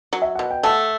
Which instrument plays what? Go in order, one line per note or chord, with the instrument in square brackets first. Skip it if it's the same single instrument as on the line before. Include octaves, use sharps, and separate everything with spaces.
[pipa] F#3
[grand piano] E5
[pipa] B2 [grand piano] F#5
[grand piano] G5
[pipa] A3 [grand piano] F#5 A5